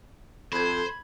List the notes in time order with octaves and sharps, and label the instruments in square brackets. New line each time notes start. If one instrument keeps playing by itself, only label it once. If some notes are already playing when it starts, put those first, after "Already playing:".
[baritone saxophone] F2 [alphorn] A4 [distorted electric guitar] C5 [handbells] B5 G#6